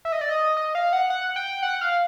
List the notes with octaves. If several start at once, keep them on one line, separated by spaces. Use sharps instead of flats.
E5
D#5
D5
D#5
D#5
F5
F#5
F#5
G5
F#5
F5